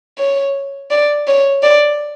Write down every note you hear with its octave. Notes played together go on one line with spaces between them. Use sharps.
C#5
D5
C#5
D5